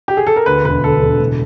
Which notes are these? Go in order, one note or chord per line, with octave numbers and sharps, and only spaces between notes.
G4
G#4
A4
A#4
D2 B4
E1 B4
D2 A4
E1
A2